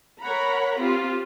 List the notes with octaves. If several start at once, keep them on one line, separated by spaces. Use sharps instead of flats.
A#4 C#5 F#5 A#5 B5
C4 F4 G4